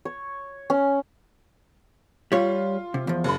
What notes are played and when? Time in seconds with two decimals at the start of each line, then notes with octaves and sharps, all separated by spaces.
0.05 C#5
0.70 C#4
2.32 G3 F4 C#5
2.94 C3
3.07 E2 F3
3.24 F#1 B5